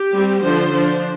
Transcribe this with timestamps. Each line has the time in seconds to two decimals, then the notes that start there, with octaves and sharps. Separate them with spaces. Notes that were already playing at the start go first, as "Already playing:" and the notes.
Already playing: G4
0.14 G3 C4
0.43 D3 F3 D4 C5
0.74 F3 D4